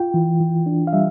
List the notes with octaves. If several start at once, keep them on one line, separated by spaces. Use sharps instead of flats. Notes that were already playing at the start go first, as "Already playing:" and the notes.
Already playing: F4 G5
E3
E3
D4
F5
G3 E5